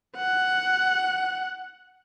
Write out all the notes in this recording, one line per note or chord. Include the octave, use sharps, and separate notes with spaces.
F#5